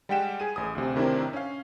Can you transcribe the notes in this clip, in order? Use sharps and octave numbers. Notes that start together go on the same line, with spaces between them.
G3 G#3 F#5 G5 B6 E7
G#4 D#7
A1 G#4 D#6
D2 C3
A2 C3 D#3 C4 D4 E4
C#4 F5